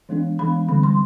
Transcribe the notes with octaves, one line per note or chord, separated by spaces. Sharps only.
E3 G#3 B3 D4
E3 G#3 B3 D4 B5
D3 G3 C4 B5
C6